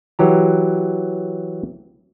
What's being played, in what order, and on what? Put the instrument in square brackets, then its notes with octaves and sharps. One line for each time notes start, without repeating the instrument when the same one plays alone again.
[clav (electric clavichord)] E3 F#3 G4 A#5